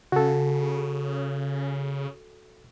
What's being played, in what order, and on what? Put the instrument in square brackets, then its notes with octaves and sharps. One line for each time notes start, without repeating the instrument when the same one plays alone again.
[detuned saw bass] C#3 [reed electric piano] F#4 A4